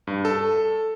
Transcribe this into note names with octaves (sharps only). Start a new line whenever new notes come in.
G2
A4